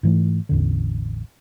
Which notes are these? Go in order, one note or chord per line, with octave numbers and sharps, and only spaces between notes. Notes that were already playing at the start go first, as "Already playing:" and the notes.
G#2 E3 A3
A1 E2 D3